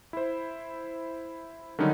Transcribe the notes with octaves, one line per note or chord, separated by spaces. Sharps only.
E4 C5
D3 D#3 F#3 G3 C#4 D#4